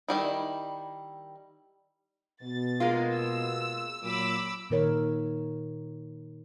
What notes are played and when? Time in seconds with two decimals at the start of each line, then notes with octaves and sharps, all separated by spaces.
0.08 D#3 G3 E4
2.43 B2 A6
2.80 G#3 A#3 F4
3.12 E6
4.03 A#2 F#3 B5 D6 E6
4.70 A#2 D#3 A#4 C#5